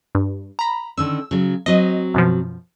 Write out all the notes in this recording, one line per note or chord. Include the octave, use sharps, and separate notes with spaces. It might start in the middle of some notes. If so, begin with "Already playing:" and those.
G2
A#5 B5
D3 D#3 C#4 E6
C#3 F#3
F#3 C4 D#5
F#2 B2 F3